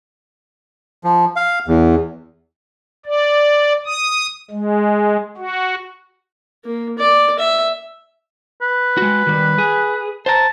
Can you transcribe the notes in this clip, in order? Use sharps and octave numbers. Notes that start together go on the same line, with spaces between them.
F3
F5
E2
D5
D#6
G#3
F#4
A#3
D5
E5
B4
G#3 F#4
D#3 G3
G#4
C5 A5 A#5